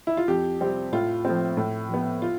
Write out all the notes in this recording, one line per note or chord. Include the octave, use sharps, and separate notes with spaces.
E4
F4
F2 G4
C3 G3 C4
A2 F4
F3 A3 C4
A2
F3 B3
F4